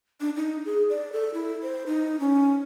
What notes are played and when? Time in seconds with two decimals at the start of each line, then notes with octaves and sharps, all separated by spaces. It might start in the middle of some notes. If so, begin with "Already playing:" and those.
0.21 D4
0.36 D#4
0.65 G#4
0.90 D5
1.12 A4
1.34 E4
1.63 C5
1.87 D#4
2.20 C#4